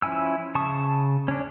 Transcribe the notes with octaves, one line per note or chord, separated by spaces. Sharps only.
F3 C#4 E4 G#5 E6
C#3 A5 C#6 D#6
C#4 D4